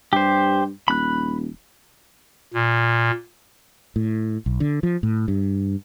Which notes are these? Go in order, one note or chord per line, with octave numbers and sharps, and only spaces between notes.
G2 G4 C5
D#1 B5 F#6
A#2
A2
B1
D3
F3
A2
G2